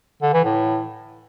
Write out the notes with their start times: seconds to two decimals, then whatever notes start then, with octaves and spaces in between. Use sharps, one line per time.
0.22 D3
0.33 E3
0.44 A2